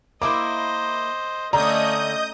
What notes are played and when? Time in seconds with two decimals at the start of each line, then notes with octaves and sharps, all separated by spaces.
0.22 A#3 E4 C5 D#5 D6
1.53 D3 A3 C#4 D#5 A#5 D#6 G6